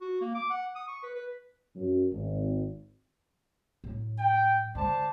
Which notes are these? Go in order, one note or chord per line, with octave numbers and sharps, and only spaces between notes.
F#4
A#3
D6
F#5
D#6
C#6
B4
B4
F#2
G#1
A2 F#3
G5
D3 G#3 C5 D5 A5